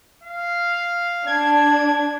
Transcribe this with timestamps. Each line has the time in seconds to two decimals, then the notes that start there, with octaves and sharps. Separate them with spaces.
0.24 F5
1.28 D4 G#6